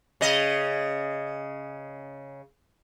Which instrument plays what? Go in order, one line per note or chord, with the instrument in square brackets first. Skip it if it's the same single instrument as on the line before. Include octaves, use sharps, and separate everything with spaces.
[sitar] C#3 D#5